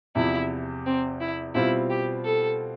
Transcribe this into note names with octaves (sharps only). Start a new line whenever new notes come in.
E2 C3 F3 E4
C4
E4
B2 G3 C4 E4 F4
G4
A4